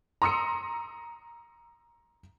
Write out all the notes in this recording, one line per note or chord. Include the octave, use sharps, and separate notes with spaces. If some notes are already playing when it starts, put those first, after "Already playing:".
A#5 C6 D#6 E6 C#7